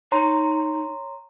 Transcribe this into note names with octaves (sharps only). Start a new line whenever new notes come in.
D#4 C#5 A#5 C6